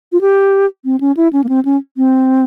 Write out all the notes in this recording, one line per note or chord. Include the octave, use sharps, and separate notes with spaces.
F4
G4
C4
C#4
E4
C#4
A#3
C4
C#4
C4